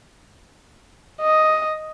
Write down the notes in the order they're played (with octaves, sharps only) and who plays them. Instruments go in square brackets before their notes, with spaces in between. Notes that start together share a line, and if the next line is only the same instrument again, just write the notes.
[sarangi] D#5